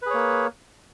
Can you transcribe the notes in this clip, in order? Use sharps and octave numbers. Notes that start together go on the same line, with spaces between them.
A#3 G#4 B4 C#5